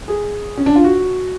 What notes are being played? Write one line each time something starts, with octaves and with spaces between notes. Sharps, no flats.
G#4
C#4
D4
F4
F#4